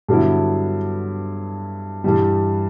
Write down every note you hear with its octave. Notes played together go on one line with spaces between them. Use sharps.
G2 D3 F#3 B3 E4
G2 E3 G3